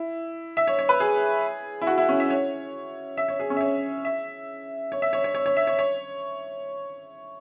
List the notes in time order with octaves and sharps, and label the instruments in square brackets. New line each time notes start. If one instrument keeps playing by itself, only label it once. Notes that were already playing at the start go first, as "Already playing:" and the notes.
Already playing: [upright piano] E4
E5
C#5
C#5
B4
G#4
E4
F#4
E4
C#4
E5
C#5
E5
C#5
G#4
C#4
E5
C#5
E5
C#5
E5
C#5
C#5
C#5
C#5
E5
C#5
C#5